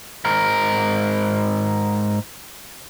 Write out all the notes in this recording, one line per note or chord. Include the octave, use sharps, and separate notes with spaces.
G#2 A#4